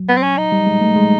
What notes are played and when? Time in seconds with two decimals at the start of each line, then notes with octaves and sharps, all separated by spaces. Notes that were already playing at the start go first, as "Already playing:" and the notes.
Already playing: F#3
0.09 B3
0.17 C4
0.23 C#4
0.37 D#4
0.52 G3
0.67 G#3
0.81 A3
0.96 G#3